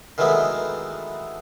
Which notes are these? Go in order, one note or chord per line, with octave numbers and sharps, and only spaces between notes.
D#3 E3 F#3 G#3 A3 B3